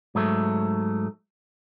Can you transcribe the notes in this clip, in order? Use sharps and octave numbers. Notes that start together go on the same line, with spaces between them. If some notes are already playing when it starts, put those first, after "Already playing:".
G#2 F#3 A3